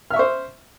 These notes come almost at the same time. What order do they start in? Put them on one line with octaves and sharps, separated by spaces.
F6 E5 C#6 C5